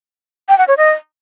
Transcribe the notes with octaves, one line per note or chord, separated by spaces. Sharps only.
G5
F#5
C#5
D#5